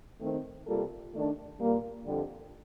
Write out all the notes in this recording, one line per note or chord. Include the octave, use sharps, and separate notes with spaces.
D#3 A3 C4
C3 G3 A#3 F4 A4
D#3 A3 D4
A#2 G3 A#3
F2 D3 G3